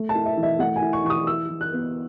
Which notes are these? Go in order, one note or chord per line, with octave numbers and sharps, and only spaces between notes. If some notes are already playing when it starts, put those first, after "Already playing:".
Already playing: A3
A5
E4
E5
E3
E5
A3 F#5
G#5
E4
C#6
E3 C#6
D#6
E4 E6
E3
F#6
B3